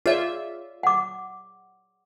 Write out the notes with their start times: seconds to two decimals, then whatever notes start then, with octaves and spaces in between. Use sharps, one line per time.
0.06 F4 G#4 C#5 D5 E5
0.83 F#5 D6